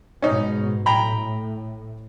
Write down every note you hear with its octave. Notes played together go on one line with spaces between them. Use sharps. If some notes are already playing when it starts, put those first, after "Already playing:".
G#2 B2 C#4 D#4
A2 G5 A#5 B5